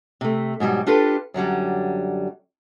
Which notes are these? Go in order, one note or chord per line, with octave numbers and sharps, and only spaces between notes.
C3 A3
G#2 B2 F#3 G3
D4 F4 G4 A4 B4
F#2 D3 F#3 G3